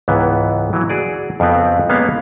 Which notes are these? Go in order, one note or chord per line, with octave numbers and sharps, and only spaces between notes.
C#2 G#2 E3 B3
E3 F#3
F#4 G#4 D5
F2 C#3 F3 B3 C4
G#3 A#3 B3 C#4 C#5 F5